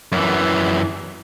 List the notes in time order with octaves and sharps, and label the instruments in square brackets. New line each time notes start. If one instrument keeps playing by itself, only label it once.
[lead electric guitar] F#2 E3